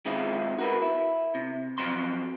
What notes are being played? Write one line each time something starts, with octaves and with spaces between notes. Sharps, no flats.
D#3 G#3 C4 E4 F4
F#4 A#4 B4
E4
C3
F3 F#3 C4 C6